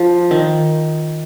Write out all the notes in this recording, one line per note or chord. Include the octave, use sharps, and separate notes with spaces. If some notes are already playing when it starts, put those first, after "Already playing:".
Already playing: F3
D#3